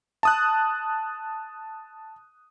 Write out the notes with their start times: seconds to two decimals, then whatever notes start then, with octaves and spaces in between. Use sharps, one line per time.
0.23 A5 D#6 F#6